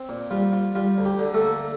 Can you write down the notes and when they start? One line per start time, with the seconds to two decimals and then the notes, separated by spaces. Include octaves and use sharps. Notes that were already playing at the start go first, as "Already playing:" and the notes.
Already playing: C4
0.09 A#2
0.31 G3 F4
0.53 F4
0.75 G3 F4
0.98 D2
1.05 G4
1.19 D3
1.34 A3 A4
1.41 A#3